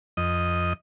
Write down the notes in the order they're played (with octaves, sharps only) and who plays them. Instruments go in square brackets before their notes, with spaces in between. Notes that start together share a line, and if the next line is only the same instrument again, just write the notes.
[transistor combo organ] F2 D#5